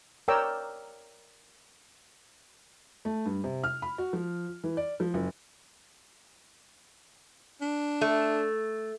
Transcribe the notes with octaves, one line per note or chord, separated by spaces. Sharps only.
A#4 C#5 D5 G5 A#5 E6
A3
G2
C3
F6
B5
F#4
F3
E3
D5
F3
F#1
D4
A3